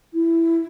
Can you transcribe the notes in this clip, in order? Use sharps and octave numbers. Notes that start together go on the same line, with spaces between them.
E4